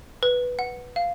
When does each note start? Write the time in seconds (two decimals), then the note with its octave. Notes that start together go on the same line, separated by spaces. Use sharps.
0.23 B4
0.59 F#5
0.96 F5